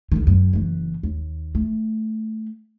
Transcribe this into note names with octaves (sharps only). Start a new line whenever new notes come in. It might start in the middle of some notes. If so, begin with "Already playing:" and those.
C#2 D#3
F#2
F#1 E3
D#2
A3